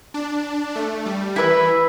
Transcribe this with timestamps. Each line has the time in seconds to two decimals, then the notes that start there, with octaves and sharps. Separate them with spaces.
0.14 D4
0.75 A3
1.06 G3
1.36 E3 E4 B4 E5